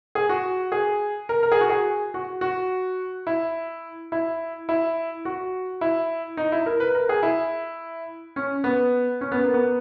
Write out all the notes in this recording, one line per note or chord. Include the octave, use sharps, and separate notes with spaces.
G#4
F#4
G#4
A#4
A#4
G#4
F#4
G#4
F#4
F#4
E4
E4
E4
F#4
E4
D#4
E4
A#4
B4
A#4
G#4
E4
C#4
B3
C#4
B3
A#3
B3